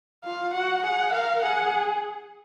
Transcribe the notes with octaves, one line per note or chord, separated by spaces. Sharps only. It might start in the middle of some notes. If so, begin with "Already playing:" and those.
F4 F5
F#4 F#5
G#4 F#5
A#4 F5
G#4 F#5